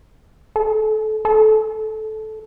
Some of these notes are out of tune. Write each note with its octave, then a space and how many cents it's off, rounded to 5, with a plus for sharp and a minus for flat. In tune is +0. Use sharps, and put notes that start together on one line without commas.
A4 -25
A4 -15